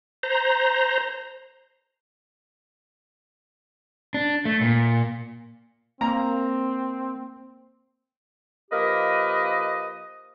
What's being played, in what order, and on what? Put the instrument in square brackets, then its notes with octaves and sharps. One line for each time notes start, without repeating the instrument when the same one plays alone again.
[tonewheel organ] C5 A#5
[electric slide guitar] D4
A3
A#2
[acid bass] A#3 [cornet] C4 [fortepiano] A#5
[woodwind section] F3 A#3 G4 A#4 B4 D#5